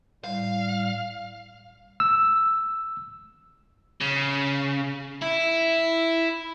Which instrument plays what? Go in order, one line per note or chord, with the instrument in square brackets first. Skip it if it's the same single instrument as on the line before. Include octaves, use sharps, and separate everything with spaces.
[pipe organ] A2 G3 [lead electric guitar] F5
[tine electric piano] E6
[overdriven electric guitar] C#3
E4